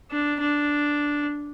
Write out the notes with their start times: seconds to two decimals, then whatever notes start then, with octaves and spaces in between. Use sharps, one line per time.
0.11 D4
0.41 D4